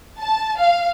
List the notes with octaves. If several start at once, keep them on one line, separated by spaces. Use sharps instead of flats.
A5
F5